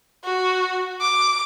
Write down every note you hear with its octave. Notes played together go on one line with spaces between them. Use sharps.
F#4
D6